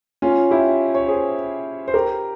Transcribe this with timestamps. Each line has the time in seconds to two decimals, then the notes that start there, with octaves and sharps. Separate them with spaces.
0.22 C#4 F4
0.51 E4 G4
0.95 C#5
1.08 G#4 C5
1.88 C5
1.94 G4 A#4